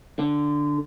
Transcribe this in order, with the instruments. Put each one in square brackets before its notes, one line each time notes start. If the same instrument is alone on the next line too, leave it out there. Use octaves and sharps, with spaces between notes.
[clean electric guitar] D3